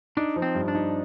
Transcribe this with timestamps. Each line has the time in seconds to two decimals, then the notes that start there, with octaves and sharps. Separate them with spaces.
0.17 D4 D#4
0.36 F3
0.42 C4
0.55 G2
0.68 D4
0.75 D#4